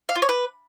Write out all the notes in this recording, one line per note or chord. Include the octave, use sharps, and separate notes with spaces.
F5
F4
C#5
B4